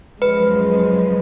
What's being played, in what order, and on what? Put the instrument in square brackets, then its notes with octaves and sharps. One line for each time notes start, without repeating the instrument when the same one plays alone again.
[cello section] F#2 C#3 F3 G#3 [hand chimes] B4